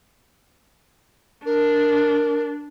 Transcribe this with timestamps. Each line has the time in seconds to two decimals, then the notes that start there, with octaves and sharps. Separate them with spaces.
1.45 D4 A#4